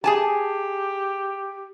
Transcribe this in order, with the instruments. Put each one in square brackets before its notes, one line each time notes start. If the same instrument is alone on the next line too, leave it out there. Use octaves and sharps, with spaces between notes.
[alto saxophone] G4 [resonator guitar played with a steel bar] G#4 G#5 A5